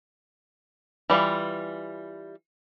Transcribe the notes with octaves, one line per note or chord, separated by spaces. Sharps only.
E3 G3 F4